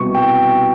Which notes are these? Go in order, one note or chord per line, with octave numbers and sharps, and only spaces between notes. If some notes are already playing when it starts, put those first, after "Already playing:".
Already playing: C2 B2 G3 C#6
G5